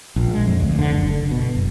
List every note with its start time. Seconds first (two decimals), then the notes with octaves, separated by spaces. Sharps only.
0.16 A#1
0.34 G#3
0.47 F2
0.60 D2
0.79 D3
0.92 F#1
1.10 D3
1.31 B2
1.55 F#1